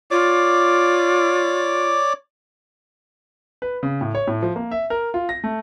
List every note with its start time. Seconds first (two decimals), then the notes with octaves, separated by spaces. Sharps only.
0.11 F4 C#5 D5 D6
3.62 B4
3.83 C#3
4.01 A2
4.15 C#5
4.27 A2
4.43 F3
4.56 A#3
4.71 E5
4.90 A#4
5.14 F4
5.29 A#6
5.44 A3